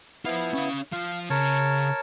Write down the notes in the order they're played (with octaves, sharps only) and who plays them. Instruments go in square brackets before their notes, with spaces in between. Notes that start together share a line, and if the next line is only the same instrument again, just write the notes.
[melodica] B3 E4 [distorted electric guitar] F4 C5
[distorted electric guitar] C#4 F5
[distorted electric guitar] F3 [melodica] F5
[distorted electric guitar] C#3 [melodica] A#4 C#5 A5